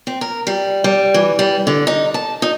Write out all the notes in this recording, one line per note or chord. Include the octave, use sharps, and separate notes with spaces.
C4
A#4
G3
G3
E3
G3
D3
D#4
A5
D#4